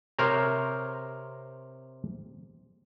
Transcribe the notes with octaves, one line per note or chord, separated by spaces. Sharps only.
C3 A#4 C5 C#5 A#5